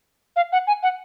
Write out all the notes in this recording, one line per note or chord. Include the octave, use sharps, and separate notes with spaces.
F5
F#5
G#5
F#5